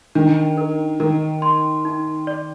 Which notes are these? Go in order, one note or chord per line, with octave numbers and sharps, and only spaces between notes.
D#3 D4
A#4
D#3 A#4
C6
D#4
D5